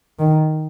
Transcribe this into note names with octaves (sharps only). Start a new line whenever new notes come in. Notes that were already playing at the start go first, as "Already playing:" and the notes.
D#3